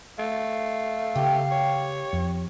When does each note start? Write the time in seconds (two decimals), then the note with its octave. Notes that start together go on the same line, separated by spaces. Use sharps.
0.18 A3 F5
1.16 C#3 G4
1.52 C#5
2.13 F2